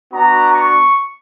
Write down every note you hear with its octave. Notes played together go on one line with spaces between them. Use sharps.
B3 D4 F#4 A#5
C#6